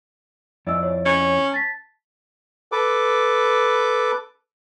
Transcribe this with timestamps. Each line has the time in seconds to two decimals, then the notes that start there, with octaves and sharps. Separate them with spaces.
0.67 F2 E4 D5 D#5 E6
0.83 C#5
1.05 C#4
1.52 A5 A6 B6
2.72 A4 B4 D6